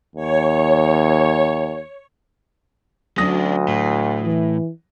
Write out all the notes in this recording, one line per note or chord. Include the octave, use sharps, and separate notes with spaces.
D#2 C#5
D2 F#3 C#4 D4 D#6 A#6
A2
E3